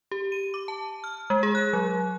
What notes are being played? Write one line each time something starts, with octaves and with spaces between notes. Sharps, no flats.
G4
D#7
D6
A5
F6
G#3
G#4
F#6
F#3